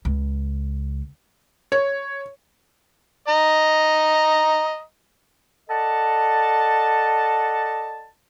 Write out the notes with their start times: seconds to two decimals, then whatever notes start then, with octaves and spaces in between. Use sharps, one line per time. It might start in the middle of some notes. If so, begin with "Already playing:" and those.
0.05 C#2
1.72 C#5
3.28 D#5 A#5
5.70 A4 D5 D#5 F#5 A5